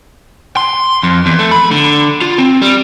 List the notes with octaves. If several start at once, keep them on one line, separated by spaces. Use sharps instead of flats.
C6
F2
E2
A3
B5
D3
F4
C4
G3